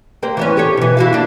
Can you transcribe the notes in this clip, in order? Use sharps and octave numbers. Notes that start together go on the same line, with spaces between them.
A#3 G4 C5
E3 B3 C#4
G4 A4 C#5
B2 E3
E4 F#4 F5
A#3 D4